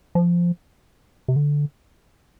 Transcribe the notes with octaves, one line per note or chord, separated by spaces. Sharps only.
F3
C3
D3